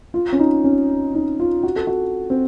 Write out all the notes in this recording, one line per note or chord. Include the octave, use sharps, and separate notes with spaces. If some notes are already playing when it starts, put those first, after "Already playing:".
F4
C#4
D#4
C#4
D#4
F4
F#4
A4
F#4
C4